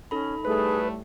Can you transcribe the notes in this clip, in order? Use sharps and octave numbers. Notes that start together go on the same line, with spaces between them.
C#4 D#4 A4 B5
A2 G3 A3 G#4 B4